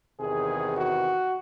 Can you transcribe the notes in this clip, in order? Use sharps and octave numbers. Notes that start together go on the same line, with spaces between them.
E2 C3 D#3 G#4
F#4